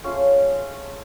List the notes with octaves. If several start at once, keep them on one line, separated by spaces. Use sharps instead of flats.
A3 C#4 F4 G#4